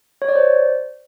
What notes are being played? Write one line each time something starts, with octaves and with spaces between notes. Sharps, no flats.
C#5
D5
C5